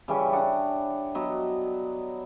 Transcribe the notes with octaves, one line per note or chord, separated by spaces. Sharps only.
C#3 E3 G3 C#4
D4 F#5
F#3 B3 D#5